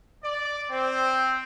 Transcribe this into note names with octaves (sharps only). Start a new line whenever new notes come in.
D5
C4